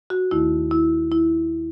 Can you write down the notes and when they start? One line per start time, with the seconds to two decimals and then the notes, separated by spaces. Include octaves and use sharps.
0.10 F#4
0.31 D#2 D#3 A3 E4
0.71 E4
1.12 E4